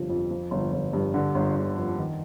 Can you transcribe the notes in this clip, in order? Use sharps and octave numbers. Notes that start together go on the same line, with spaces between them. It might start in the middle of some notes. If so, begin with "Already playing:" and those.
Already playing: G1 C3 F3
F2
F3
G1
G1
G2
D3
G1
G1
F2
D#3